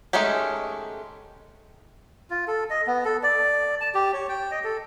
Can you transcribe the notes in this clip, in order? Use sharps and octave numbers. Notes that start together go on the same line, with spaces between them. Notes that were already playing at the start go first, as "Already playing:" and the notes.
D#3 G#3 A3 C#4 G4
F4
A4
D#5
B3
A4
D5
A5
G4
C#5
G5
D#5
A4